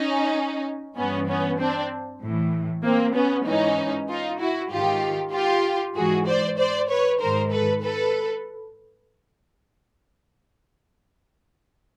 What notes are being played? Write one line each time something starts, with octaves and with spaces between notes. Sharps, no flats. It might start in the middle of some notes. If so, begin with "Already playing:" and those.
Already playing: C#4 D#4
G2 E3 B3 C#4
B3 C#4
C4 D4
A2 E3
A#3 C4
B3 C#4
G#2 E3 C#4 D#4
D#4 F4
E4 F#4
G#2 D#3 F4 G4
F4 G4
G#2 E3 F#4 G#4
C5 D5
C5 D5
B4 C#5
G#2 D#3 A#4 C5
A4 B4
A4 B4